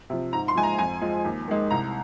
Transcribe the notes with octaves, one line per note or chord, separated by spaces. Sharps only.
C3 F3
G#2 A#5
C6
F3 G#3 G#5
A#5
F2 G#5
F3 G#3
D#2
D#3 G#3
C2 A#5